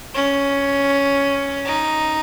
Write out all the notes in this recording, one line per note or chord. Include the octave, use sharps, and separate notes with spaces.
C#4
D#4